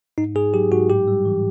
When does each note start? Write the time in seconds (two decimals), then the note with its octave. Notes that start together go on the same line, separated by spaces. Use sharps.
0.18 G#2 D#4
0.35 G#2 G#4
0.54 F#3 G4
0.71 G#2 F#4
0.89 A2 G4
1.08 G3
1.25 E3